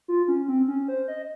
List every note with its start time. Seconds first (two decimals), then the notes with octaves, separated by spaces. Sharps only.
0.08 F4
0.28 C#4
0.48 C4
0.68 C#4
0.88 C5
1.08 D#5